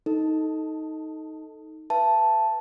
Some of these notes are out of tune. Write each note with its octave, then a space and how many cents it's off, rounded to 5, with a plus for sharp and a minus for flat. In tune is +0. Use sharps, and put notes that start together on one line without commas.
D#4 +15 A4 +0
B4 +0 E5 +35 A5 +0